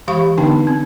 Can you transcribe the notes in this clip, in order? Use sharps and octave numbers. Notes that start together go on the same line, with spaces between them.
E3 G#3 G4 F5 B5 C#6
D3 B3 D4 D#4 G5 A5
C4